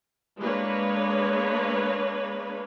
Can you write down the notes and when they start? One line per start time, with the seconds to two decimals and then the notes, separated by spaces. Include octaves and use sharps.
0.38 G#3 A#3 D4 B4 C#5